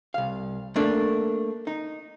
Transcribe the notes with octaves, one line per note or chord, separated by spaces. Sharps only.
C2 F5
A3 A#3 D4
D#4